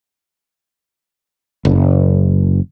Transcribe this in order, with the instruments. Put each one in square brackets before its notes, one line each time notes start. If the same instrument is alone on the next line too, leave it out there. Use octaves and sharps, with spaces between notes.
[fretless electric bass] F#1